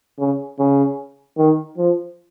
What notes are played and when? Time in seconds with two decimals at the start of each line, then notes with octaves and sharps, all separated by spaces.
0.19 C#3
0.59 C#3
1.38 D#3
1.77 F3